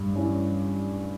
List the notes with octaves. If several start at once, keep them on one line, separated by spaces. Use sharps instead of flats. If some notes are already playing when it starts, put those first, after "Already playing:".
Already playing: G2
G3 C#4 E4